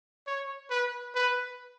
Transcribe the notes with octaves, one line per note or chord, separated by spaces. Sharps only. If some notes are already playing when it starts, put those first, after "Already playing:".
C#5
B4
B4